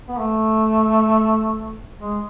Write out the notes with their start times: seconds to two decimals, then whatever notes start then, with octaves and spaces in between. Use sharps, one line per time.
0.08 B3
0.19 A3
2.00 G#3